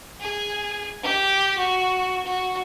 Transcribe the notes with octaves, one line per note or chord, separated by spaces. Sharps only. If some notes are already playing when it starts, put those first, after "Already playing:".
G#4
G4
F#4
F#4